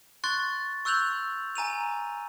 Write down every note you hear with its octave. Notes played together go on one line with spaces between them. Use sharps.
C6 C#6 F#6 A6
C#6 E6 F#6 G6 F7 F#7
G#5 A#5 D#7 F7